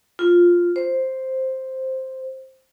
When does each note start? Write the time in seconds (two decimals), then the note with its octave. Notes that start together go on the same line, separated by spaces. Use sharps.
0.19 F4
0.76 C5